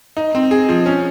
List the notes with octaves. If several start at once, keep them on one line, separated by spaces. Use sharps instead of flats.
D#4
C4
G#4
F3
C#4